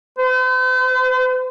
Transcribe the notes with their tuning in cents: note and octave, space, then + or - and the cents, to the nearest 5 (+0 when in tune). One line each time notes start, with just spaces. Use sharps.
C5 -45